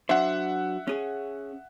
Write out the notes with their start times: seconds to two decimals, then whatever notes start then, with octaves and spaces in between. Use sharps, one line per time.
0.09 F#3 D4 C5 E5 F#5
0.87 C#4 G#4